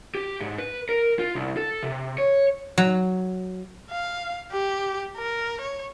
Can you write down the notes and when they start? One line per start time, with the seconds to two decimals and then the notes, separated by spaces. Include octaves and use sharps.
0.15 G4
0.40 G#2
0.58 B4
0.89 A#4
1.19 F4
1.35 C2
1.57 A4
1.83 C3
2.18 C#5
2.78 F#3
3.90 F5
4.52 G4
5.17 A#4
5.61 C#5